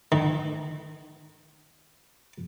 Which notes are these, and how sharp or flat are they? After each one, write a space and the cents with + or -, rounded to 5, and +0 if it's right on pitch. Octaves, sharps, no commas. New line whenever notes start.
D#3 -30